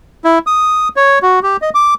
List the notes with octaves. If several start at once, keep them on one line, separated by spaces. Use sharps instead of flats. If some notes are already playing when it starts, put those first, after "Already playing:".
E4
D#6
C#5
F#4
G4
D#5
D6